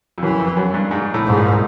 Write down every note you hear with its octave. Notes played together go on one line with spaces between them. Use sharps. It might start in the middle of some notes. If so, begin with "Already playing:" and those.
F2
F#2 E3
F2
F#2
G2
G#2
A2
G#2
A#2